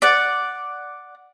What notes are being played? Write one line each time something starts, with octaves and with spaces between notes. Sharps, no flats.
D5 F#5